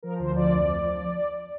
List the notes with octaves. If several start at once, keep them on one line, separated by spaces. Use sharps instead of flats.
F3 A#4
D2 C5
F3 D5
F2
F3